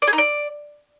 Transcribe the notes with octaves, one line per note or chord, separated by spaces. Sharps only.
D5
G#4
D#4
D5